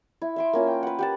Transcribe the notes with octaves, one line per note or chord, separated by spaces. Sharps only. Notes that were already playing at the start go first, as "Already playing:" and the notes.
E4
E5 C6 D6
A#3 C#4 F4
G5
B4 F#5
G4 F#5 A5